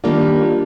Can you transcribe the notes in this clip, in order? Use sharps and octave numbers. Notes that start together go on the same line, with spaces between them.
D#3 G3 A#3 D4 F4